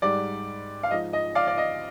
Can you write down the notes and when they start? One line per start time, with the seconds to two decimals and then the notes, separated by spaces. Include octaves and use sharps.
0.02 G#2 G3 D5
0.83 F5
0.91 G#2 F3 D#5
1.13 D#5
1.35 D5 F5
1.47 D5
1.58 D#5